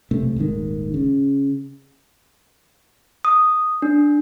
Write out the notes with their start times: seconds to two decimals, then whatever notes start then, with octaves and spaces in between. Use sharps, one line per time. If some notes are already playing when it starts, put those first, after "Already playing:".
0.11 B1 C3 A3
0.36 D#1 G#1 G#2 D#3
0.94 C#3
3.25 D#6
3.82 D4